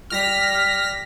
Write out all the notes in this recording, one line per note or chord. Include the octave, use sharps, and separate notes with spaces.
G3 F6 A#6 B6